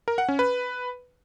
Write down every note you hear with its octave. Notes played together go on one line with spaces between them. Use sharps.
A#4
F#5
C#4
B4